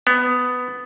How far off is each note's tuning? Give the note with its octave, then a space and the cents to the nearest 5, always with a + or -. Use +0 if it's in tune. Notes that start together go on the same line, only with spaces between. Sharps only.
B3 +10